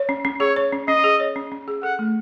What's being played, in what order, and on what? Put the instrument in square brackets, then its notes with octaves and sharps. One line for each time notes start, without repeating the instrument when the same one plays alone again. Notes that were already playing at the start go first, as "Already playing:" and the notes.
Already playing: [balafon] C#5
C#4
C#4
[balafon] G#4 [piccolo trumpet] C#5
[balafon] C#5
C#4
[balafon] C#4 [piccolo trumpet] D#5
[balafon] G#4
C#5
C#4
C#4
G#4
[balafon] A4 [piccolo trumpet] F#5
[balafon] A3